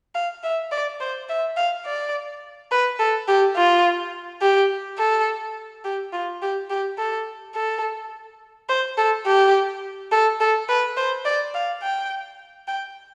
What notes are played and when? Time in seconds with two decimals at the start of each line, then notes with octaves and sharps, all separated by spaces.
0.15 F5
0.44 E5
0.71 D5
1.00 C5
1.29 E5
1.57 F5
1.86 D5
2.71 B4
2.99 A4
3.28 G4
3.56 F4
4.42 G4
4.98 A4
5.85 G4
6.13 F4
6.42 G4
6.70 G4
6.98 A4
7.55 A4
8.69 C5
8.98 A4
9.26 G4
10.12 A4
10.40 A4
10.69 B4
10.97 C5
11.25 D5
11.54 F5
11.82 G5
12.68 G5